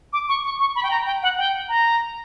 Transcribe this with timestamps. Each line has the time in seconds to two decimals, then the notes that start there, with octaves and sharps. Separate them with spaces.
0.13 D6
0.29 C#6
0.44 C#6
0.60 C#6
0.76 B5
0.83 G5
0.91 A#5
1.06 G5
1.23 F#5
1.38 G5
1.69 A#5